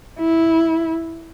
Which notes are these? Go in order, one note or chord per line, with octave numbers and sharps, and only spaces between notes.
E4